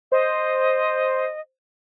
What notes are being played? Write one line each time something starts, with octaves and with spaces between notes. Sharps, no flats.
C5 D#5